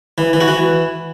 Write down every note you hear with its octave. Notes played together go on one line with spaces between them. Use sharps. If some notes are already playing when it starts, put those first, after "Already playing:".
E3
E3
F#4
E3